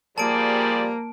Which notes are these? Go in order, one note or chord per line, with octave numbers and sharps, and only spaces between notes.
F3 G3 A#3 G#4 D5 A5 D7